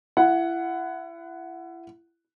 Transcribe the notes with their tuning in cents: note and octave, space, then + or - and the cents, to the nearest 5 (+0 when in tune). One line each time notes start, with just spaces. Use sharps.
E4 +30 F#5 +0